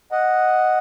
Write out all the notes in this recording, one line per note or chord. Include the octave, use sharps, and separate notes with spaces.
D#5 F#5